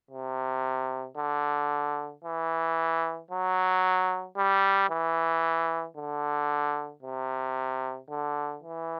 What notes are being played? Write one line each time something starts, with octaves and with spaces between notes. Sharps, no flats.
C3
D3
E3
F#3
G3
E3
D3
C3
D3
E3